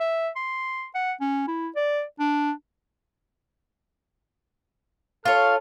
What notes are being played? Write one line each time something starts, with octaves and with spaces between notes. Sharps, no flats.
E5
C6
F#5
C#4
E4
D5
D4
F4 A4 C#5 F6